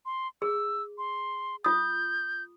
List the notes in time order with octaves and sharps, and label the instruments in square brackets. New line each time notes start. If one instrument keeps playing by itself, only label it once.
[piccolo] C6
[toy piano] G#4 [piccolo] E6
[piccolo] C6
[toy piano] F4 D#6 [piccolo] G6